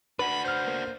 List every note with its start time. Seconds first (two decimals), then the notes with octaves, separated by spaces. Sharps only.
0.19 D4 F#4 B4 B5
0.45 C5 F6 G6
0.67 A#3 B3